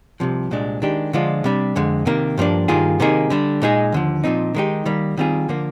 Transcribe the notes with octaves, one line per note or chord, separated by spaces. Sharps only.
C2 C3 F3
C2 A#2 G#3 D4
D#3 G#3 D4 G4
D3 F3 G#3 D4 F4
C3 G3 D4
F2 D3 G#3
C3 D#3 A#3
G2 F3 A#3 D4
G2 D#3 A#3 F4 G#4
C3 D#3 A#3 D#4 G#4
D3 G3 D4
A#2 G#3 D#4 G#4
D#2 D3 F3
A#2 F3 C4 D#4
D#3 G#3 D#4 G4
D#3 G3 A#3
D#3 G3 C4 F4 G#4
D3 F3 A#3